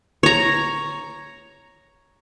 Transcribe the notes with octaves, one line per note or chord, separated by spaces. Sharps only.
C#5 A#5